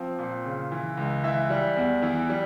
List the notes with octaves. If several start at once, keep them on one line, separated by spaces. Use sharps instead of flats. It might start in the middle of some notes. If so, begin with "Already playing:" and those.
Already playing: F3 C4
A#2
C#3
E3
C#2
E3 E5
G3
E2
E3
G3